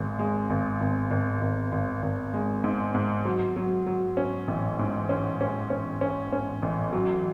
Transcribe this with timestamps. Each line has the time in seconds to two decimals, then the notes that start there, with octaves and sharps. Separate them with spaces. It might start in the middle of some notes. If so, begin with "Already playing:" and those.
Already playing: G#1 G#3
0.19 G#3
0.50 G#1
0.81 G#1
1.11 G#1
1.42 G#1
1.72 G#1
2.03 G#1
2.34 G#3
2.64 G#2
2.94 G#2
3.25 F#3
3.56 F#3
3.86 F#3
4.17 C#4
4.48 A1
4.79 G#2
5.09 C#4
5.41 C#4
5.70 C#4
6.01 C#4
6.32 C#4
6.62 A1
6.93 F#3